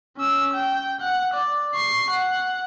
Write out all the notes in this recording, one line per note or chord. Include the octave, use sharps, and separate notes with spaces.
C#4 E6
G5
F#5
D5
C#6 C7
F#5